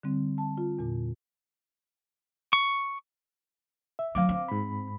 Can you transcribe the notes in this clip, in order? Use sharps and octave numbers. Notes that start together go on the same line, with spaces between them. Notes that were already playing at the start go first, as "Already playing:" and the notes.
D3 G3 C4
A5
F4
E2 A#2
C#6
E5
F#3 C4 F5 D6
C4
G#2 B5